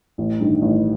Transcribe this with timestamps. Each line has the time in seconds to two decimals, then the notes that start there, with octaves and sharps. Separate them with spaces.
0.18 A1
0.40 G2 D#3
0.62 A1